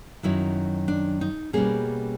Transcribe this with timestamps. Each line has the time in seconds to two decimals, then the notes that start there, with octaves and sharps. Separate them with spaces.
0.23 F#2 D#3 F#3 E4
0.88 D4
1.21 D#4
1.53 B2 G3 A#3 C#4 G#4